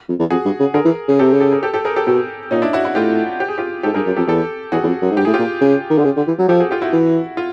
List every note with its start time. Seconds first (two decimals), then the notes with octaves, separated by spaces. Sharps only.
0.09 F2
0.19 E2
0.30 F2 F#4 G#4
0.45 G2
0.60 C#3
0.74 D3 G#4 A#4
0.85 E3
1.08 C#3 G#4
1.19 C3 G4 A4
1.33 C#3
1.40 G4 A4
1.52 G#4 A#4
1.63 G4 A4
1.73 G4 A4
1.85 G#4 A#4
1.96 G4 A4
2.07 B2 G4 A4
2.51 A#2 C#4 D#4
2.62 D4 E4
2.73 E4 F#4
2.85 E4 F#4
2.95 A2 F4 G4
3.40 G4
3.48 G#4
3.58 F4 G4
3.83 G#2 G4 A4
3.94 G2 G#4 A#4
4.06 F#2
4.17 F2 G4 A4
4.28 E2 G4 A4
4.72 E2 F#4 G#4
4.83 E2
4.87 F2
5.02 F#2
5.11 G#2
5.17 G2 G4
5.25 A2 G#4
5.34 F4 G4
5.39 A#2
5.61 C#3
5.90 D#3
5.98 D3
6.05 C#3
6.17 D3
6.27 E3
6.39 F#3
6.48 F3 G4 A4
6.60 F#4 G#4
6.71 F4 G4
6.82 E4 F#4
6.93 E3
7.37 F4